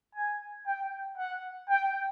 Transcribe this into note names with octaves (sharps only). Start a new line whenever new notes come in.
G#5
G5
F#5
G5